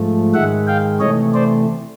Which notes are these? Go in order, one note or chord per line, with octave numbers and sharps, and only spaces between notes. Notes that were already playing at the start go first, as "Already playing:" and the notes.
Already playing: G#2 F3 A3
G#2 D#3 G#3 E5 F#5
F5 G5
C3 E3 A3 C#5 D#5
C5 D5